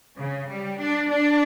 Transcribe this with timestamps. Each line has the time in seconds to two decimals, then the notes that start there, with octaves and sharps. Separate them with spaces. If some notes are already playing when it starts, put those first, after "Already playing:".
0.18 C#3
0.49 G3
0.80 D4
1.10 D4